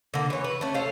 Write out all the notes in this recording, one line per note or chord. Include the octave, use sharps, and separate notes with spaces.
D3 A#3
E3 C#5
B4
A3 C#4
A4 C5 C#5 F5